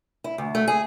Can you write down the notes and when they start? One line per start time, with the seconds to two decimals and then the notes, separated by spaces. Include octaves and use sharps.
0.24 E4
0.38 D2
0.55 A3
0.68 G#4